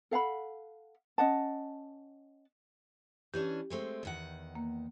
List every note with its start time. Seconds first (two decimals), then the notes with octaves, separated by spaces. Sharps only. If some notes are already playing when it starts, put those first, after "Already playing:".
0.11 A4 F5 F#5 B5
1.18 C#4 D#5 F#5 A5
3.34 E3 C#4 D4 G4
3.70 G#3 A3 C4
4.03 E2 D#3 F#5
4.55 A#3